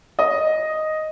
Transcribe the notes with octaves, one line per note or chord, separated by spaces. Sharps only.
D#5